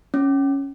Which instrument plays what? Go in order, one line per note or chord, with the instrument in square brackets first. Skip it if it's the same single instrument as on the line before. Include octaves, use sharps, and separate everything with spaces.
[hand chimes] C#4